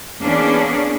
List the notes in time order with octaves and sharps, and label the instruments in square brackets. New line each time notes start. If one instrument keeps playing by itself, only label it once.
[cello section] E3 A#3 B3 C#4 D4 G#4